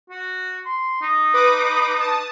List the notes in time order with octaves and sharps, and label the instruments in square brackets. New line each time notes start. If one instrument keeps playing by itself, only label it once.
[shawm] F#4
C6
D#4
[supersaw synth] B4 D6 D#6
A5 D#6